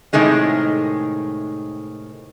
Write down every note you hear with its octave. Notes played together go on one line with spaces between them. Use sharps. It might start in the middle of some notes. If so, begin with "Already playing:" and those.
A2 C3 D#3 G#3 D#4